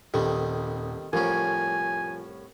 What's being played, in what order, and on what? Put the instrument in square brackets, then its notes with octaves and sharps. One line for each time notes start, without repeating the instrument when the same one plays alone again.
[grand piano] D#1 [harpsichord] C3 D#3 G3 [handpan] A4
[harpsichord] C2 A2 C#4 [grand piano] F3 [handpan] A#4 [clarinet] G#5